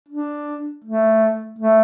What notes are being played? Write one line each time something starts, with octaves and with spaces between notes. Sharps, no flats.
D4
A3
A3